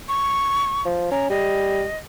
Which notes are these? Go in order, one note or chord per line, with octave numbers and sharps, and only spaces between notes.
C#6
F3
C#4 A#5
G3 D#5